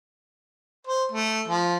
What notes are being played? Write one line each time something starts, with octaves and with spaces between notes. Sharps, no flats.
C5
A3
F3